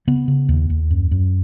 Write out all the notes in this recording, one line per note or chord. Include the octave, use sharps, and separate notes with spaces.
C#3 B3
C#3
D#2
D#2
F#2
F#2